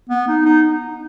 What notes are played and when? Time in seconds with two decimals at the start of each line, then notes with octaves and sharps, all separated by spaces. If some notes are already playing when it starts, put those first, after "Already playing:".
0.09 B3
0.28 D#4
0.45 D#4